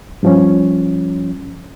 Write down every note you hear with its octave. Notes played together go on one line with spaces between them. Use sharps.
G2 F3 C#4